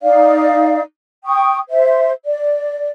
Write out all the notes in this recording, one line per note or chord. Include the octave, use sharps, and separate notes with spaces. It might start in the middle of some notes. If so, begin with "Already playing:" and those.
D#4 D5 F5
G5 C#6 D#6
C5 E5
D5